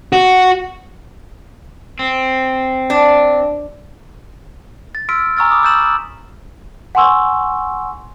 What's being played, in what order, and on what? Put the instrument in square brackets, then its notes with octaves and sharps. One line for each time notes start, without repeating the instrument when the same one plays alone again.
[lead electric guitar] F#4
[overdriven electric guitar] C4
[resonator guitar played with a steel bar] D4
[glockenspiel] A6
C6 E6 F6 B6 D7
G#5 A#5 C#6 E6 F6 A6
B5 D6 D#6
A#5 E6 G6 A6 E7 F#7
E6
[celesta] F#5 G#5 C6 C#6 E6